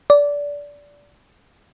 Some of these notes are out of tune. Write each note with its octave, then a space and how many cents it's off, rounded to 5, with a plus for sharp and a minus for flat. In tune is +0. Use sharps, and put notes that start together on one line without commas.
D5 -20